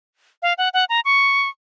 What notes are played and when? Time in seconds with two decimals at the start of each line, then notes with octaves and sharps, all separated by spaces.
0.42 F5
0.58 F#5
0.74 F#5
0.89 A#5
1.05 C#6